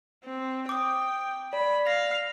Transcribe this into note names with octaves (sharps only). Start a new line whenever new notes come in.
C4
G5 D6 D#6
D5 B5
F5 A#6